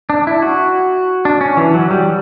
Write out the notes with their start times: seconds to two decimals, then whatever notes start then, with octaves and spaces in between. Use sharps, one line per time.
0.10 D4
0.27 E4
0.42 F#4
1.25 D4
1.41 C#4
1.57 E3
1.74 F#3
1.91 G3